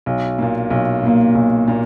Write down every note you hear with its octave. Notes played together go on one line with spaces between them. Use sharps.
B1
A#2 A#3
B1
A#2 A#3
B1
A#2 A#3